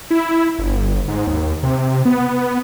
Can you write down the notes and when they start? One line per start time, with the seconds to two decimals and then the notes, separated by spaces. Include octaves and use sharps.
0.11 E4
0.59 G1
1.08 G#2
1.27 D#2
1.63 C3
2.05 B3